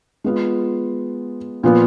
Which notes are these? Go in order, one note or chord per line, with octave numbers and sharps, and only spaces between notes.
G#3 B3 F4
A#2 F3 B3